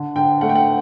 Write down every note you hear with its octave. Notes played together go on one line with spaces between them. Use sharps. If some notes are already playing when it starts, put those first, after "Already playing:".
Already playing: D3
D3 G5
A3 F#5
G5
F#5